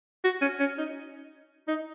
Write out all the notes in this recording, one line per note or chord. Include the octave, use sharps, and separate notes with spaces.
F#4
C#4
C#4
D#4
D#4